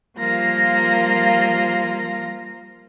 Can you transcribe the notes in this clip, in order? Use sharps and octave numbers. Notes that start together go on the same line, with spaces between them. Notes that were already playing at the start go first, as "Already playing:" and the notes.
F3 G3 A#3 F4 A#6